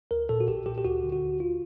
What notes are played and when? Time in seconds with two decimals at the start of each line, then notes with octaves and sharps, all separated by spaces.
0.11 D2 A#4
0.29 A#2 A4
0.40 F#4
0.48 B1 G4
0.66 A#2 G4
0.78 G4
0.84 D2 F#4
1.03 D3
1.12 F#4
1.22 D2
1.40 F4